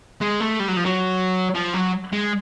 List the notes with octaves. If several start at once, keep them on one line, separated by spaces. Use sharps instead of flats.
G#3
A3
G3
F#3
F3
F#3
F3
F#3
G#3